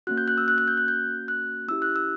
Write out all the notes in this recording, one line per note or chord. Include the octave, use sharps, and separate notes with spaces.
A#3 C#4 F#4 F#6
G6
F#6
E6
F#6
F#6
G6
F#6
G6
F#6
C#4 E4 G4 E6
F#6
E6